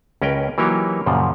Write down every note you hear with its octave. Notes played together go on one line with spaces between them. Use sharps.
C#2 C#4 A#4 B4 G5
E3 F#3 A#3 D#4 G4 C#5
F#2 A#2 C#3 F3